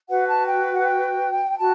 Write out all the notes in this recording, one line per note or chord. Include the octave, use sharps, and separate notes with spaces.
F#4 B4 F#5
A5
G5
F#5
G5
F#4 A5